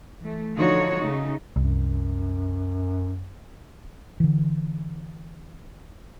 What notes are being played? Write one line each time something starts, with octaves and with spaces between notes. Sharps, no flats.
E3 A3
D3 F3 D#4 F4 F#4 C#5
C#3 A3 D#4
C2 F#2
D3 E3